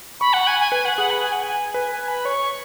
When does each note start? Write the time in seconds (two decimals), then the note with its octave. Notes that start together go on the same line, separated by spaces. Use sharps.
0.20 B5 C#6
0.33 F#5
0.47 G#5
0.60 G#5
0.72 B4 G#5
0.85 F#5
0.97 G#4 F#5
1.10 B5
1.22 G#5
1.32 F#5
1.43 G#5
1.74 B4 G#5
1.92 G#5
2.08 B5
2.25 C#5 C#6